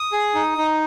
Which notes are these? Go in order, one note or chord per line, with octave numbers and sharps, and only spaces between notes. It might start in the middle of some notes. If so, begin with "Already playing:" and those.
Already playing: D#6
G#4
D#4
D#4